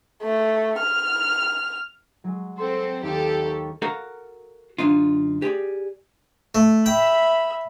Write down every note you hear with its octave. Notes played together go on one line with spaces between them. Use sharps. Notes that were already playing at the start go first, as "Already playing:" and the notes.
A3
F6
F#3 G#3
C4 A4 C6
D#2 G4 A4
A#4 G5 C#6
F#4 A4 A#4 F5 F#5 A#5
F#2 D3 D4 D#4 F4
G4 G#4 C5 D5
A3
E5 G5 B5